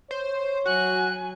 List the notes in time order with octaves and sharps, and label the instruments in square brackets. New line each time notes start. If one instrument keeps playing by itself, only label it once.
[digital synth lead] C5 [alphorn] C#5
[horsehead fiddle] F#3 G#5 [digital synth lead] F#4 [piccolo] F#6